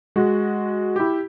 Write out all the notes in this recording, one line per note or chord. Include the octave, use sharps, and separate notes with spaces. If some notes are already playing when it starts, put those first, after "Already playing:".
G#3 F#4
E4 G4